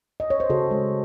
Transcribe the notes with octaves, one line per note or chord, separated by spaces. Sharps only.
D#5
C#5
C5
C#3 F#4 A4
G#3